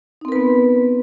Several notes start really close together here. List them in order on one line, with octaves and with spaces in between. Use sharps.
D#4 C4 A#4 B4 B3